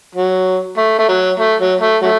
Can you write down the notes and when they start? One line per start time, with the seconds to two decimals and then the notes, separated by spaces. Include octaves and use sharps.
0.15 F#3
0.77 A3
0.99 A3
1.09 F#3
1.40 A3
1.60 F#3
1.81 A3
2.02 F#3 A3